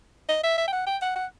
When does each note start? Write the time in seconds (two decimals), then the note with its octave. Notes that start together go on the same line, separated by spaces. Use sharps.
0.29 D#5
0.43 E5
0.58 E5
0.67 G5
0.72 F#5
0.87 G5
1.02 F#5
1.16 F#5